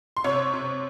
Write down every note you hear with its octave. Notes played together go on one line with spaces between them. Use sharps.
C6
C3 C#5 C#6
C3